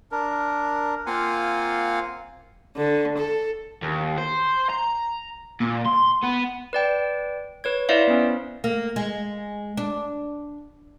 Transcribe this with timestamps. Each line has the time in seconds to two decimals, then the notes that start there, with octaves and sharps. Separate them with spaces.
0.12 D4 A#4
1.06 A#3 C4 F4 F5 F#5 G#5
2.77 D3
3.17 A4
3.82 D#2
4.18 C5
4.70 A#5
5.60 A#2
5.85 C6
6.23 B3
6.73 B4 D5 G5
7.64 B4 C#5 G#6
7.89 E4 B4 C5 D5 E5 F5
8.07 B3 C#4
8.64 A#3
8.96 G#3
9.77 D4